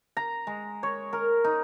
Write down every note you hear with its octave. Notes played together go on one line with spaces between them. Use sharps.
A#5
G#3
C#5
A#4
D#4